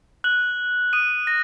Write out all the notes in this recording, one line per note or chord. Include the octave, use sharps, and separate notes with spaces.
F#6 F#7
D#6 D#7
A#6